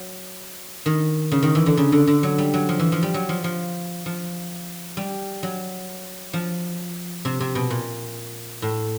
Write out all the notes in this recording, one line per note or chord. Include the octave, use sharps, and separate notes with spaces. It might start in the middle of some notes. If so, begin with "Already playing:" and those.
Already playing: F#3
D#3
C#3
D#3
E3
D3
C#3
D3
D3
F#3
G3
F#3
F3
E3
F3
G3
F#3
F3
F3
F3
G3
F#3
F3
C3
C3
B2
A#2
A2